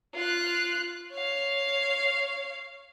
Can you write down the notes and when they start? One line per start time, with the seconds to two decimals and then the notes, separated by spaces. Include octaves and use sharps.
0.15 F4 F#6
1.13 C#5 F5